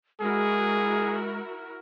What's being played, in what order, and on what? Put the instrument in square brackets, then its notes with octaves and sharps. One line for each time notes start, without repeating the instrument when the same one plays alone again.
[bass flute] G#3 [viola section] E4 F#4 A#4 [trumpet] G#4